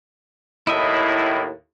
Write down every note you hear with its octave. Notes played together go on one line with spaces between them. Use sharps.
D#2 A2 E4 D#5 E5